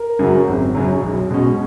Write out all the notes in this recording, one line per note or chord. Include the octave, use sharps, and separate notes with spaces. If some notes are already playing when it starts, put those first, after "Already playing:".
Already playing: A#4
F#2 C#3 F#3
G#1
F#2 C#3 F#3
B1
B2 G#3 C#4